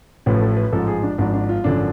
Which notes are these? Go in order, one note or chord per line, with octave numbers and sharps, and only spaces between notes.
A1 A2 F3 B4
B4
A4
B4
A1 G#2 F3 A4
G#4
D4
G#1 G#2 F3 D4
D4
F4
G#1 F#2 D3 F3 D4